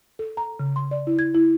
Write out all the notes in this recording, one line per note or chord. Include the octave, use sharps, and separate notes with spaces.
A4
A#5
C#3
C6
D5
E4
G#6
E4